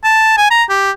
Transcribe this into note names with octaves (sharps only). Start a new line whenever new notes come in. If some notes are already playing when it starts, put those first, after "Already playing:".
A5
G#5
A#5
G4